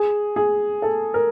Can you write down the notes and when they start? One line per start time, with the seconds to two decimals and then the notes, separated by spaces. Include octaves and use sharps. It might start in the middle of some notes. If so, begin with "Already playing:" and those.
Already playing: G#4
0.36 G#4
0.82 A4
1.14 A#4